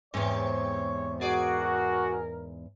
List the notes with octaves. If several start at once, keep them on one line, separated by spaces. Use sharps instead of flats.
E2 G#2 C3 C4 C#5
F#4 G#4 A#4 D5